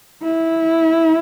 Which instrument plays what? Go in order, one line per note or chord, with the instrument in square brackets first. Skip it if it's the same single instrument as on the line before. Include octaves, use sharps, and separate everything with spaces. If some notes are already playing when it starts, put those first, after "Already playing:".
[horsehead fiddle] E4